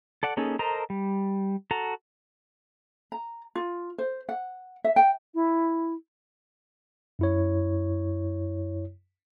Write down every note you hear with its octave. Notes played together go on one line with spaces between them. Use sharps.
A4 D5 F#5
A#3 C#4 D#4 G#4 A4
A4 A#4 C5 D#5 A#5
G3
F#4 A4 A#5
A#5
F4
C5
F#5
E5
G5
E4
F#2 E4 C#5